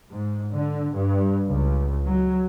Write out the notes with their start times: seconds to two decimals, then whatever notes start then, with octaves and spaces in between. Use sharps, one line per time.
0.11 G#2
0.52 D3
0.97 G2
1.48 C#2
2.06 F#3